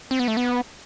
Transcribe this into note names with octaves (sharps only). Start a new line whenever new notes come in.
C4
B3
A3
B3